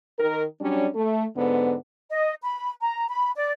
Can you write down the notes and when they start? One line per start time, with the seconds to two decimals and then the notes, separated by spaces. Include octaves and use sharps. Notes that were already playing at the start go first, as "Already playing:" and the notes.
0.19 D#3 A#4
0.61 F#3 G3 C#4 D4
0.95 A3
1.36 G#2 D3 B3
2.10 D#5
2.44 B5
2.81 A#5
3.08 B5
3.36 D5